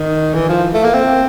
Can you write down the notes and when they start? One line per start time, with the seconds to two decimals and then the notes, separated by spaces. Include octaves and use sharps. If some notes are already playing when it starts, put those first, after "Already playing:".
Already playing: D#3
0.34 E3
0.49 F3
0.74 A3
0.84 A#3
0.94 C4